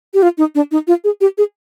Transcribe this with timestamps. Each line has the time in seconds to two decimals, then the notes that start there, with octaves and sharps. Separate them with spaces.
0.14 G4
0.22 F4
0.38 D#4
0.55 D4
0.71 D#4
0.87 F4
1.04 G#4
1.21 G4
1.38 G#4